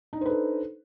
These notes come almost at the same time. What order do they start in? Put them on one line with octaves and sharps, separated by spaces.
D#4 D4 C5 B4 A4